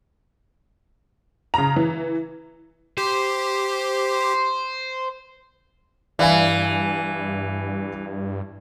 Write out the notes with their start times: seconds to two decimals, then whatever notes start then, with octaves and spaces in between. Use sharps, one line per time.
1.54 C#3 A#5
1.76 E3
2.98 G4 C5
6.19 G2 E3 D5 F5 G#5